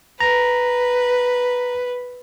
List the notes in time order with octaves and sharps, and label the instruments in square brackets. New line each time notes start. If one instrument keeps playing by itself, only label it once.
[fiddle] B4 [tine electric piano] A#5